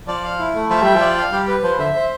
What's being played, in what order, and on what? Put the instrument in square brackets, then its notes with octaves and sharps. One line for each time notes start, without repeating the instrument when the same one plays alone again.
[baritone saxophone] F3 [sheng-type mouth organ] D5
[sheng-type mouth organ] F5
E4
A3
[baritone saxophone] F3 [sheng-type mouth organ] E5
[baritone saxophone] G3 [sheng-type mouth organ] G5
[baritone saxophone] F3 [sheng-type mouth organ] D5
[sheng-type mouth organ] F5
[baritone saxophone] G3 [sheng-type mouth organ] G4
[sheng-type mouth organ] B4
[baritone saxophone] F3 [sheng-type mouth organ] C5
[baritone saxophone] D3 [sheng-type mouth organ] E5
[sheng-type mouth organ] C5